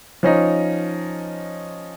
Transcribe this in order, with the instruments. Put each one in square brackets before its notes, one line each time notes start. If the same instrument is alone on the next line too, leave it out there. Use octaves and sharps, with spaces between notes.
[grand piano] F3 C#4 D#4